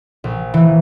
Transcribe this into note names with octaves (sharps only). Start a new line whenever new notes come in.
A#1
E3